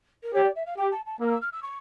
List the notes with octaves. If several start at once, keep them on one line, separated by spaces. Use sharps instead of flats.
A#4
G4 C#5
D5
E5
F5
G4 G5
A5
A5
A#3 E6
F6
E6
F6
E6
C#6